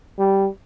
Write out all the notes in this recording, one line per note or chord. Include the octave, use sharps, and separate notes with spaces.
G3